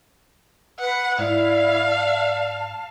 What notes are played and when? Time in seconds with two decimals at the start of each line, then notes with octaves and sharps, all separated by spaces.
0.79 B4 F#5
1.19 G#2 E4 D5 F5
1.85 A5